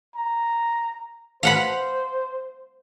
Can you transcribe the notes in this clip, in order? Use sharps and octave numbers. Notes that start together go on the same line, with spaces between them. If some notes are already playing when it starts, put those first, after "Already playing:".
A#5
C5 F5 F#5 B5